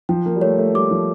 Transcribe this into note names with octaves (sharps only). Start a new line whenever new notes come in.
F3 G5
A#3
G3
A3 C#5
A3
G3 D6
F3